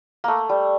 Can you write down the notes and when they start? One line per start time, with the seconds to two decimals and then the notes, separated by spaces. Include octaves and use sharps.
0.24 A3 A#3
0.49 G3